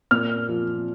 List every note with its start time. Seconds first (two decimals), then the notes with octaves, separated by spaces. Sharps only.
0.11 A#2 F6
0.49 F3